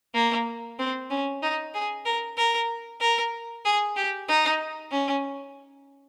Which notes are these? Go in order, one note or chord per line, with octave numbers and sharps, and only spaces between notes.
A#3
C4
C#4
D#4
G#4
A#4
A#4
A#4
G#4
G4
D#4
C#4